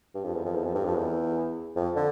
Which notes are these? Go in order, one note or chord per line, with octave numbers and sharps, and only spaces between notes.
G2
F2
E2
F2
E2
F2
G2
F2
E2
F2
D3